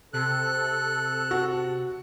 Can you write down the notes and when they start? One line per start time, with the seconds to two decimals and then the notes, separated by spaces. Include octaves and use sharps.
0.13 C3 A4 F#6
1.31 F#4